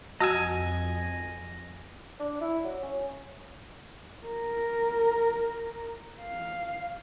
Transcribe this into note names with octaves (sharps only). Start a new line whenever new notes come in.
F2 F#4 D#5 G#5 A5 D#6 E6
D4
E4
F#3
C#4
A#4
F5